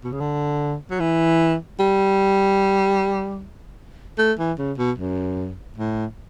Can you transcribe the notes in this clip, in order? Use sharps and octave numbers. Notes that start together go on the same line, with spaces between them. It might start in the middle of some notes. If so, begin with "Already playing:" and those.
B2
C#3
D3
F#3
E3
G3
A3
E3
C#3
B2
F#2
A2